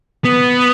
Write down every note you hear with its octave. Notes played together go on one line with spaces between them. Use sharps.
B3